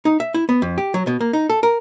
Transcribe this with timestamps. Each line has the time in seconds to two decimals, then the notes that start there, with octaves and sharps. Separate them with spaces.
0.05 D#4
0.20 E5
0.34 E4
0.49 B3
0.62 F2
0.78 G4
0.94 F#3
1.07 B2
1.21 A#3
1.33 D#4
1.50 A4
1.63 A#4